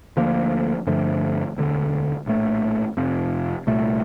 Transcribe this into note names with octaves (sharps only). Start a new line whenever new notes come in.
D2 D3 F3 A#3
G2 D3 F3 A3
E1 D2 D3
A#1 A2 F3 A3
F1 F2 C3 F3
C2 A#2 A3